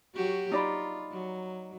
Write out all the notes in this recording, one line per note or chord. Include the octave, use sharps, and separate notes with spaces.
F#3 F#4 G4
D#4 F4 D5 B5
F#3